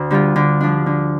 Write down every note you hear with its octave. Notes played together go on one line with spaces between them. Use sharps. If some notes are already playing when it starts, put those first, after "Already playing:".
Already playing: D2
D3 G3 F4
D3
F3 D4
D3